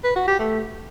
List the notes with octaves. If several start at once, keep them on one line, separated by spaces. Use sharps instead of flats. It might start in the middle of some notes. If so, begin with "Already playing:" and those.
B4
F#4
G4
A3